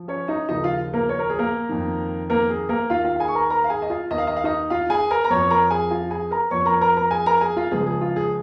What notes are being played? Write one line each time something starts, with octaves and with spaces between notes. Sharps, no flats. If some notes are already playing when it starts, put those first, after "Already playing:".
Already playing: F3
C#4 C#5
D#4 D#5
D#2 C#3 F3 D#4 D#5
F4 F5
A#3 A#4
C#5
A#4
G#4
A#3 A#4
F2 D#3
A#3 A#4
G#4
A#3 A#4
D#2 D#3 F4 F5
F4 F5
F5
G#4 G#5
C#6
A#4 A#5
A#4 A#5
F5
G#4 G#5
D#5
F4 F5
D#2 D#3 D#5
F5
D#5
F5
D#4 D#5
F4 F5
G#4 G#5
A#4 A#5
A#5
F2 F3 C#5 C#6
A#4 A#5
G#4 G#5
F4 F5
G#4 G#5
A#4 A#5
F2 F3 C#5 C#6
A#4 A#5
A#4 A#5
A#4 A#5
G#4 G#5
A#4 A#5
G#4 G#5
F4 F5
C#2 C#3 F3 G#4
G#4
F4
G#4